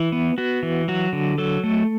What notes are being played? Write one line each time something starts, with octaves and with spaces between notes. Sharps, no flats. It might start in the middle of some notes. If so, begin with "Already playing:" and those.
Already playing: E3 E4
B3
B3 F#4
E3
F#3 F#4
D3
F#3 A4
A3